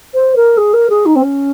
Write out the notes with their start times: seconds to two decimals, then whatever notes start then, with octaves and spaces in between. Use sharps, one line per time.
0.14 C5
0.35 A#4
0.57 G#4
0.73 A#4
0.89 G#4
1.05 D#4
1.15 C4
1.22 C#4